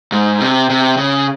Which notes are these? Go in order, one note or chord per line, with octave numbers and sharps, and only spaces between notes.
G#2
C3
C3
C#3